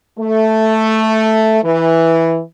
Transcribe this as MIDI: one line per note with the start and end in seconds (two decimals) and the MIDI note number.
0.19 1.59 57
1.63 2.42 52